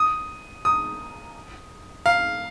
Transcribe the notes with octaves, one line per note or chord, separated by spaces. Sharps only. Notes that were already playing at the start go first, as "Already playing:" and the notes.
Already playing: D#6
D#6
F5